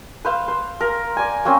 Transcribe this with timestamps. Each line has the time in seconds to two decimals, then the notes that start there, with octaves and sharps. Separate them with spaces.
0.25 B4 C5 F5
0.48 C5
0.81 A#4
1.17 D5 G#5
1.45 A#3 C4 C#4 C5